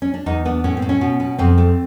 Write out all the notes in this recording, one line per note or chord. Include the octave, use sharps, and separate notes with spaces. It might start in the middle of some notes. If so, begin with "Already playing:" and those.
C#4
D4
E2 D#4
B3 D4
A2 C#4
C4
A2
C#4
B2
B2
F2 C4
A3